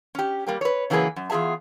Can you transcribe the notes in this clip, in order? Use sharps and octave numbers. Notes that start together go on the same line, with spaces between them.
C#4 G4
G3 A#3 G4
B4 C#5
C#3 E3 F#3 A#3 G#4 B4
F#2
E2 F4 G#4 E5 A5